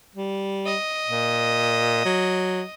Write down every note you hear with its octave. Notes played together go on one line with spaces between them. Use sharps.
G3
D#5
A#2
F#3